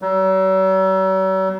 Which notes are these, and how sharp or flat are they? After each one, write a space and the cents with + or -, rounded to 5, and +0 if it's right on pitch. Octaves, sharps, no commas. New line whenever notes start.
F#3 +45